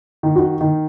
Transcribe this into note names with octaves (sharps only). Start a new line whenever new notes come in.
D#3
F#4
D#3